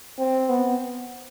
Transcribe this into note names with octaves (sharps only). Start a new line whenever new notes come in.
C4
B3